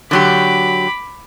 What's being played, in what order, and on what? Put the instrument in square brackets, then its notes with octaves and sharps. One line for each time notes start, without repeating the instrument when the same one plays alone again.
[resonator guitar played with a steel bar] D3 F#3 G4 [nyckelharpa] B5 D6